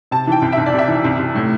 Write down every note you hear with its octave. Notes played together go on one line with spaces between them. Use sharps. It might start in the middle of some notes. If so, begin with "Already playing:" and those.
C3 A5
E3 G5
C2
E5
C2
D5
C3
E5
E3
C2
C2
A2